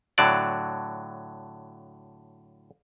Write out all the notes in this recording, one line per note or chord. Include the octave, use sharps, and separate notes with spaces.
A2 D3 F#3 D5